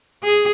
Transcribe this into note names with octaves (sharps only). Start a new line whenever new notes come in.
G#4